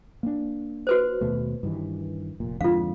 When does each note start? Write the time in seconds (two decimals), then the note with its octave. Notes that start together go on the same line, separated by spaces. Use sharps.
0.23 A#3 C4 D4
0.87 F#4 B4 C5
1.21 D#2 B2 A3
1.63 G2 D#3 E3
2.40 F1 A#2
2.61 F2 G#2 D3 F4 F5